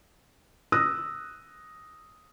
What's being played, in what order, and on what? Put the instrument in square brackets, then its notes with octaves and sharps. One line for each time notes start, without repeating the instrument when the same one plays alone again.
[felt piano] D#6 E6 F#6 A#6